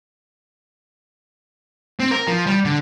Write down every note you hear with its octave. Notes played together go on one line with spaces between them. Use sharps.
C4
A#4
F3
G3
D3